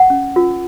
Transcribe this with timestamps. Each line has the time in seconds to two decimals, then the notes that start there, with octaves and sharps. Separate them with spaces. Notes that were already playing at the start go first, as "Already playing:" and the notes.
Already playing: F#5
0.10 C#4
0.36 F4 A#4